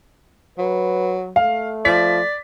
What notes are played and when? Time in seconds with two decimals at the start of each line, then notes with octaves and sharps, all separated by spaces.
0.58 F#3 B4
1.36 A3 F5
1.85 F3 D5 B6